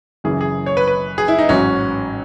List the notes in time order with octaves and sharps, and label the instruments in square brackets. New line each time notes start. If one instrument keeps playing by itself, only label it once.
[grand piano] F#1 F#2 C#3 E3 G#4
G#4
C#5
B4
B4
G#4
E4
D#4
A1 G#2 F#3 C#4